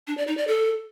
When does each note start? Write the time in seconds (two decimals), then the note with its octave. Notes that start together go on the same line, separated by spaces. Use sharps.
0.07 D4
0.17 D5
0.27 D#4
0.37 D5
0.47 A4